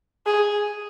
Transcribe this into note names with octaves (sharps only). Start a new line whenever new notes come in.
G#4